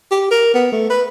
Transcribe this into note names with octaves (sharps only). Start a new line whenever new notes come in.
G4
A#4
B3
A3
B4